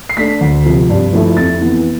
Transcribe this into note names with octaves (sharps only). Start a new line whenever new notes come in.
C7
A3 D4 B6
D2
C3 F3
G2
F3 A3 E4
F2 A6
E3 B3 E4